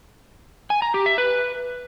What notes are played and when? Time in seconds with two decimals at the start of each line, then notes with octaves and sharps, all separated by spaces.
0.70 G#5
0.82 A#5
0.94 G4
1.06 E5
1.18 B4